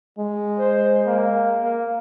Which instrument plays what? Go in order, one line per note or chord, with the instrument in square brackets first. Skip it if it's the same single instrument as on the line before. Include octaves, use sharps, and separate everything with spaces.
[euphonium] G#3
[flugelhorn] C5
A#3
A#3